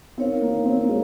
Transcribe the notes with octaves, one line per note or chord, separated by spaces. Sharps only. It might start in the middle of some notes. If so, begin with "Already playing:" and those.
C4 D#4 A#4 C#5 F5
A#3
C4
A#3
G#3